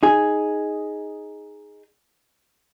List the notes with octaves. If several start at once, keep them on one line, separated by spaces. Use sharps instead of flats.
D#4 G#4